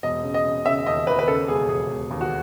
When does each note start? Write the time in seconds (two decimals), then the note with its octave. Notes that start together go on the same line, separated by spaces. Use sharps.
0.03 E1 D#5
0.24 C#3
0.34 D#5
0.45 C#3
0.66 C#3 E5
0.86 D#2 D#5
1.07 D#2 B4
1.19 B4
1.28 C#3 A4
1.48 E1 G#4
1.69 E1 G#4
1.90 E1
2.11 D#2
2.21 F#4